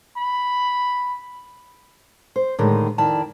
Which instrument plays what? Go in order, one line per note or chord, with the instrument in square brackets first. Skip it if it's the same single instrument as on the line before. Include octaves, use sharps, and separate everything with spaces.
[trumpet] B5
[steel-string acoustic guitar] C5
A2 D3 D#3 G#3 D#4
F2 D#3 E4 D5 A5